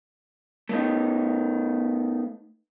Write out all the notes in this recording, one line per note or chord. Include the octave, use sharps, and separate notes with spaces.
A3 B3 D#4